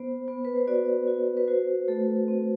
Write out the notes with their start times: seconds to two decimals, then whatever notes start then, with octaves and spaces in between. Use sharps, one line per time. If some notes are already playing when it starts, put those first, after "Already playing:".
Already playing: B3 C5
0.28 B3
0.45 B4
0.56 C5
0.67 F#4 D5
1.08 F#4
1.37 B4
1.47 F#4 C5
1.88 A3 A4
2.28 C4